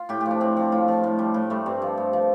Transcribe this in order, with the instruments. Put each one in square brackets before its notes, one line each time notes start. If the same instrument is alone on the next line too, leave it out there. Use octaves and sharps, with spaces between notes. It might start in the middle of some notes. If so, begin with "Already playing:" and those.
Already playing: [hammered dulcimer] F4
A2 G4
G4
F3
D4
A2 C4
F3 C4
A2 F4
F3
A2
G3
A2
G3 A3
G2 C4
F3
G2
F3